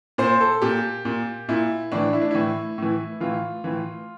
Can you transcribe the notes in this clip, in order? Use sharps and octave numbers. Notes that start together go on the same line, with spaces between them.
A#2 C5
A4
A#2 G4
A#2
A#2 E4
A2 E3 D4
E4
D4
A2 E3 E4
A2 E3
A2 E3 F4
A2 E3